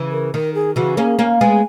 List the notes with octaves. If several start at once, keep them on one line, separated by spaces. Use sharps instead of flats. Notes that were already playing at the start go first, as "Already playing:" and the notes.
Already playing: C#3 E3
A#4
D#3 A#4
G#4
C#3 E3 F#4
A#3 C#4 G#4
A#3 C#4
G#3 B3 G#5